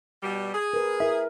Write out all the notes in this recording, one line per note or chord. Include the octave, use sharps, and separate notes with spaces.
B2 G3
G#4
A#4 B4
E4 A#4 E5